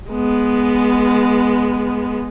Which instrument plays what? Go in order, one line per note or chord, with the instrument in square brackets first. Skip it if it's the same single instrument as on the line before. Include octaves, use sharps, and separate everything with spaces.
[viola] G#3 B3